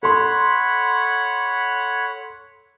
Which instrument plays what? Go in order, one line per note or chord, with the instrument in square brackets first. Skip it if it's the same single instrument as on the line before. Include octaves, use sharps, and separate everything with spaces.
[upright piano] A4 C6 [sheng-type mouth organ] C#5 F#5 B5